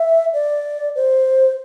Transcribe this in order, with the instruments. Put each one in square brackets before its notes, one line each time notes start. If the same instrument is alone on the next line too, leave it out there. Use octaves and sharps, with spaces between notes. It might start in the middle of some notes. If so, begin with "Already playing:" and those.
Already playing: [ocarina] E5
D5
C5